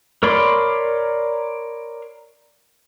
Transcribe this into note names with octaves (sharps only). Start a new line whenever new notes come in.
A#4 C#5 D5 B5 C6